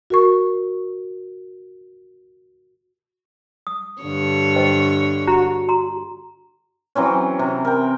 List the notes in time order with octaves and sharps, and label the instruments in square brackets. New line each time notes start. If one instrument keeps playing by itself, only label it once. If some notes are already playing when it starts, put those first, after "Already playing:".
[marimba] F#4 A#4 C#6
[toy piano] D#6
[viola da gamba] G2 D3 C#5
[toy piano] C5 D#5 G5
[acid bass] F#4 [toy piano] A#5
[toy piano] A#5 C6
[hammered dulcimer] E3 F#3 C4 C#4
C3
A#4 G5